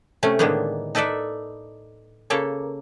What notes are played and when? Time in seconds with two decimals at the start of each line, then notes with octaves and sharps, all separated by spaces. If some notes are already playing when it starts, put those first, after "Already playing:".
0.23 C3 A3 C#4
0.39 A2 D3 D#3 G#3 A#3 B3
0.95 D#4 A4 B4 D5 E5
2.30 C#3 A#3 A4 C#5